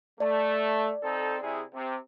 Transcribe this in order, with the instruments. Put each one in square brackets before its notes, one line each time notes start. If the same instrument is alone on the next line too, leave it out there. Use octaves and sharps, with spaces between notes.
[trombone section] A3 [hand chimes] D5
[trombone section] C4 D#4 A4
C3 E4 G#4
C3